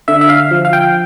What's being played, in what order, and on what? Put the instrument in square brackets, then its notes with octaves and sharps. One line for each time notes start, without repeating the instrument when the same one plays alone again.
[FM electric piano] D3 E5
E5
F5
F3
F5
G5